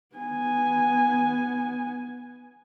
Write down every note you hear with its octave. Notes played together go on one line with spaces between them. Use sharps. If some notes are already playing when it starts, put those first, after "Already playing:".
B3 G#5